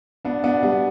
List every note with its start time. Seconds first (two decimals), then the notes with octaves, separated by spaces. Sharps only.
0.25 B3 D4
0.44 B3 D4
0.63 G3 B3